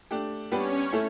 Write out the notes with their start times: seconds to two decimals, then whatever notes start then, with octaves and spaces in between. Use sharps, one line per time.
0.11 A3 D4 G4
0.51 G3 B3 C#4 D4 G4 B4 C#5
0.93 A3 E4 A4